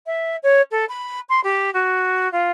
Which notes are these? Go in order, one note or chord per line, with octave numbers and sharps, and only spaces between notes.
E5
C#5
A4
B5
C6
G4
F#4
F4